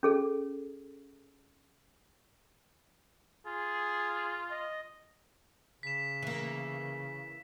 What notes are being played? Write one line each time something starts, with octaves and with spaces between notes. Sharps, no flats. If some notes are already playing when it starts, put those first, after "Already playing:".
C#4 G#4 A4
F4 G#4
D#5
C#3 B6 E7
E3 A#3